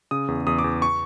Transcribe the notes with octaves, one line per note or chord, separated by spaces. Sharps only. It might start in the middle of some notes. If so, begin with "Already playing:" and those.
C#3 D#6
E2
E2 D#6
D6
E2
C#6